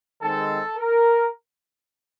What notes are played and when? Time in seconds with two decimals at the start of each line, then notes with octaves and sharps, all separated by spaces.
0.21 D#3 G#3 C4 A4
0.77 A#4